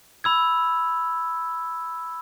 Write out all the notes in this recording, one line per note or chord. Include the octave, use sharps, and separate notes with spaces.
B5 E6 G#6